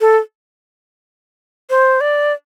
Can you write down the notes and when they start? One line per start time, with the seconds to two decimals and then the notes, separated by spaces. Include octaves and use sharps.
0.01 A4
1.70 C5
2.01 D5